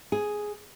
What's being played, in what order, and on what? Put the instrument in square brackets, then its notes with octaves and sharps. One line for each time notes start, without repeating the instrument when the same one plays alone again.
[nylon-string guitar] G#4